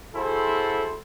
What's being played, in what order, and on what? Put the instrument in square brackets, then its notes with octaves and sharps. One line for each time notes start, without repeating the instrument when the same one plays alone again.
[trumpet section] E4 F#4 G#4 A4 C5